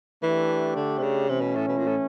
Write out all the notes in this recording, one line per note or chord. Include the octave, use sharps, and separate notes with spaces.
E3 A3 D4 G4
D3
C3
C#3
C3 E3 A3 C#4
B2
A2
B2
A#2
A2